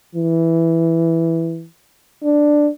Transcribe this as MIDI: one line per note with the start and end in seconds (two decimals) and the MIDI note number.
0.15 1.65 52
2.23 2.69 62